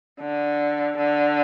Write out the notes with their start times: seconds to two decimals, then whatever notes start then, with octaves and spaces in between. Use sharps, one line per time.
0.21 D3
0.97 D3